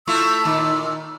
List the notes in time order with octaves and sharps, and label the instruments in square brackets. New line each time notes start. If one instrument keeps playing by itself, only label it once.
[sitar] A3 E4 F4 [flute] E6
[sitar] A#2 D#3